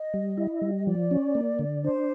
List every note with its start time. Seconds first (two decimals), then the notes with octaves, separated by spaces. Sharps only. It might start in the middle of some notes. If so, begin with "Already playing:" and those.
Already playing: D#5
0.14 G3
0.38 E4
0.62 G3
0.87 F3 D5
1.11 C#4
1.35 A#3
1.59 D3
1.84 D4 C5